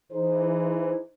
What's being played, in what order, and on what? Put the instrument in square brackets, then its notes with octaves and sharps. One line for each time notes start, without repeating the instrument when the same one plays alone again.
[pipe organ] E3 [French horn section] D#4 G#4 C5